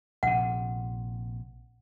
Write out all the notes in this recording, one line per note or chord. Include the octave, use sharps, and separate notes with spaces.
A#1 C3 F#5